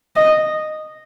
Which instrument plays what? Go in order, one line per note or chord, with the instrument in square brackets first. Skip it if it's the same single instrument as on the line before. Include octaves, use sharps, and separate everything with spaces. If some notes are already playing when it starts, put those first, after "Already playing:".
[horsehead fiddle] D#5